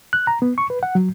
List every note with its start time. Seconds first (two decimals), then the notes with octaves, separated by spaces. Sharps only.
0.13 F#6
0.27 A#5
0.42 B3
0.58 C#6
0.70 B4
0.83 F#5
0.95 F#3